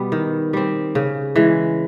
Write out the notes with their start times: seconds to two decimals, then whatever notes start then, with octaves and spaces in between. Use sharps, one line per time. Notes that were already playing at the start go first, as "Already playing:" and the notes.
Already playing: B2 G3 B3
0.12 D#3
0.53 G3 C4
0.95 C#3
1.35 E3 G#3